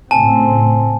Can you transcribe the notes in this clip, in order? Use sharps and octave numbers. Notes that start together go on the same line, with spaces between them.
A2 C#3 C4 G#5 A5